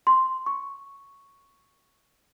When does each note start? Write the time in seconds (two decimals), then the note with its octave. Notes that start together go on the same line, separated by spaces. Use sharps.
0.07 C6
0.46 C#6